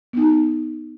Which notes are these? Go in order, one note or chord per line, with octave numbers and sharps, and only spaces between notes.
B3 D#4